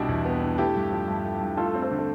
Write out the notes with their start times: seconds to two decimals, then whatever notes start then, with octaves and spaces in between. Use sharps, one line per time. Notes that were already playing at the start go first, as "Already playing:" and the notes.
Already playing: C2 B2 B3 D4 E4 G4
0.09 E2
0.25 B3
0.42 D4
0.58 A3 E4 G4
0.75 G2
0.91 F3
1.08 G2
1.25 A3
1.41 G2
1.57 A3 F4 A4
1.74 C4
1.82 A4 C5
1.91 D3
1.98 A4